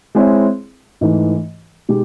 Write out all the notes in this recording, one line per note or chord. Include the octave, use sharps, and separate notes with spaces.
G#3 C4 E4 G#4 C#5
G#2 E3 A3
B2 G#3 B3 D#4 G4